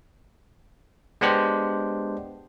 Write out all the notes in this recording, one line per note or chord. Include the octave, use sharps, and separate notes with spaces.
G#3 B3 D4 G4 C5